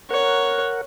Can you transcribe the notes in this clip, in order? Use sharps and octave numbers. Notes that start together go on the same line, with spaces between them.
A#4 C#5 F#5